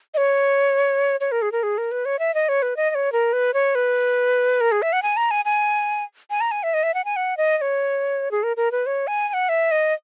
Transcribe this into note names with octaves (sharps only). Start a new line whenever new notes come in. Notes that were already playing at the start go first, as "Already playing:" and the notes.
D#5
C#5
C#5
A#4
G#4
A#4
G#4
A#4
B4
C#5
E5
D#5
C#5
B4
D#5
D#5
C#5
A#4
B4
C#5
B4
A#4
G#4
E5
F#5
G#5
A#5
G#5
G#5
G#5
A#5
G#5
E5
D#5
E5
F#5
G#5
F#5
D#5
D#5
C#5
G#4
A#4
A#4
B4
C#5
G#5
G#5
F#5
E5
D#5